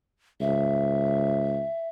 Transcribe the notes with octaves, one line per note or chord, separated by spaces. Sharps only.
C#2 E5